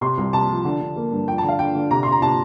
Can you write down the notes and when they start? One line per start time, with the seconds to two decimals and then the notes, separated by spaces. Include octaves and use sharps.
0.01 C3 C6
0.18 C2
0.33 C3 A5
0.49 F3
0.65 D3
0.81 D3
0.96 A#3
1.12 G2
1.28 F3 G5
1.38 A5
1.43 D3
1.49 F5
1.59 D3 G5
1.75 D3
1.91 C3 A#5
2.03 C3 C6
2.12 A#5
2.22 C3 A5